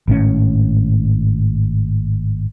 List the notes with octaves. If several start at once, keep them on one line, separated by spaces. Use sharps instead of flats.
G#1 A2 C#4